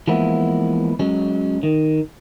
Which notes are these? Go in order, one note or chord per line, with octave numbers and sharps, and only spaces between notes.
E3 F3 G#3 A#3 B3 E4
F#3 G#3 C#4
D#3